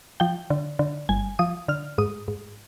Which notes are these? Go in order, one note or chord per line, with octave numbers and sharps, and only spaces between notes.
F3 G5
D3
D3
G1 G#5
F3 D#6
D3 F6
G#2 D#6
G#2